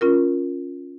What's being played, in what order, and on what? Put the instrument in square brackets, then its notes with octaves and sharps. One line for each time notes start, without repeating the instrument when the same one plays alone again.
[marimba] C#4 F4 A#4